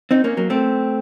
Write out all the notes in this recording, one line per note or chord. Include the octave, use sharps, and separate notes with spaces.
C4 D#4
A#3 C#4
F#3 A#3
A3 C4